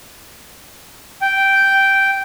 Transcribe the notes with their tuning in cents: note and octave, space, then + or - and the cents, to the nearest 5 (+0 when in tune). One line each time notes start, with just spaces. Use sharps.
G5 -5